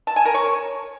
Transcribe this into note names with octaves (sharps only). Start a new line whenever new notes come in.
A5
G#5
A#4
C#5